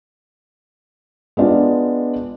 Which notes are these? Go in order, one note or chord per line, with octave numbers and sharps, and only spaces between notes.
G#3 B3 D4 F4